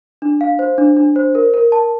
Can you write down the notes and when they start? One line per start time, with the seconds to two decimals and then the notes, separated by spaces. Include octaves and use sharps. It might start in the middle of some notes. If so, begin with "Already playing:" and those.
0.22 D4
0.41 F5
0.59 C5
0.78 D4
0.97 D4
1.16 C5
1.35 A#4
1.54 A#4
1.72 A5